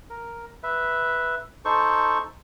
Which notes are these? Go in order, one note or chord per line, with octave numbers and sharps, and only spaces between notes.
A#4
B4 E5
D#4 A4 C5 C#6